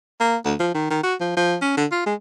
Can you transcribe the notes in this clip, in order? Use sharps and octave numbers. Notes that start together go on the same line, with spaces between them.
A#3
D2
F3
D#3
D#3
F#4
F3
F3
C#4
D3
F4
G#3